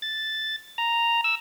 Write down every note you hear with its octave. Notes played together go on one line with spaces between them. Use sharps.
A6
A#5
E6